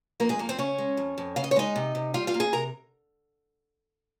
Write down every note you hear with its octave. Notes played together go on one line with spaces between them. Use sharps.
F2 A#3 A#4
G#3 G#4
F2 A#3 A#4
C4 C5
C#3 C#4 C#5
G#3
F2
F2
C#3 F5
D#5
C#5
G#3 D#4 D#5
C3
C3
G3 F4 F5
F4 F5
A#3
G#4 G#5
C3 A#4 A#5